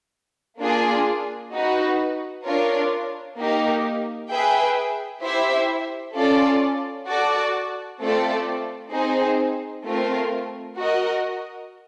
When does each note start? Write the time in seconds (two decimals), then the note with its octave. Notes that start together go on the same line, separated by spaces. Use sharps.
0.59 A#3 D4 F4 G#4
1.51 D#4 F#4 B4
2.44 D4 F4 A#4 C#5
3.37 A#3 D#4 G4 A#4
4.29 G#4 B4 E5 G5
5.21 E4 G4 C5 E5
6.14 C#4 F4 A4 D5
7.07 F#4 A4 D5
7.99 A3 C4 F4 A4 D5
8.91 C4 D#4 G#4 C5
9.84 A3 C4 F4 A#4
10.76 F#4 A#4 D#5